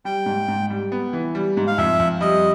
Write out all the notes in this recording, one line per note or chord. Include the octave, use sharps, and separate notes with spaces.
G3 G5
G#2
G#2
G3
B3
E3
G3
G#2
F5
F2 E5
F2
G3 D#5